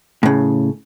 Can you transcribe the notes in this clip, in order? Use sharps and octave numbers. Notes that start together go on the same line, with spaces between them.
A2 C#3